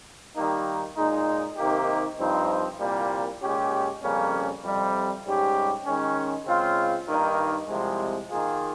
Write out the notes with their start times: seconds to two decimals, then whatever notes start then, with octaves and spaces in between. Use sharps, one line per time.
0.35 D#3 G3 A#3 D#4
0.96 A#2 G#3 D#4
1.57 C3 D#3 A#3 D#4 G4
2.18 G2 F3 C4 D#4
2.79 C2 A#2 G3 A#3
3.41 A#2 G#3 C#4 G4
4.02 F2 C#3 G3 A#3 C#4
4.63 F2 C3 G3
5.24 G#2 G3 C#4 G4
5.85 D#3 G#3 C#4
6.46 C#3 G#3 C4 F4
7.08 G2 D#3 A#3 D#4 A#4
7.68 C2 C3 F3 G#3
8.30 D#3 A#3 F4 G#4